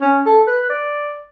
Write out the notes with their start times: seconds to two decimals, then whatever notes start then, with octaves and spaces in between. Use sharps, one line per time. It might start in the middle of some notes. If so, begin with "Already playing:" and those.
0.01 C#4
0.26 A4
0.47 B4
0.70 D5